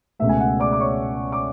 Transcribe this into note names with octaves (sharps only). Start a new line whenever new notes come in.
C#2 B2 A3 E5
G#5
F#5
D5 D6
D6
C#5 C#6
D6